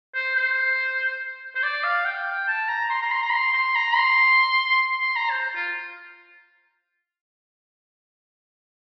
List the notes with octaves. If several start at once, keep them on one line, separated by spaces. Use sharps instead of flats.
C5
C5
C5
D5
F5
G5
A5
A#5
C6
A#5
C6
A#5
C6
C6
A#5
C6
C6
A#5
C5
F4